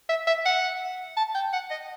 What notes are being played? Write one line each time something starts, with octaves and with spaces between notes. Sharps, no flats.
E5
E5
F#5
A5
G5
F#5
D#5